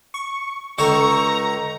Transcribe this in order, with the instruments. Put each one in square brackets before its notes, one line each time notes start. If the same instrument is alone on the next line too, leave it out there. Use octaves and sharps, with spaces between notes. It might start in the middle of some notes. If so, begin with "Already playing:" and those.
[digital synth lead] C#6
[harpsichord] C#2 A4 C5 [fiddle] A#5 [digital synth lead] C#6